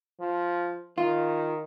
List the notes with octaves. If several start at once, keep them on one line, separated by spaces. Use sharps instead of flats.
F3
D#3 F4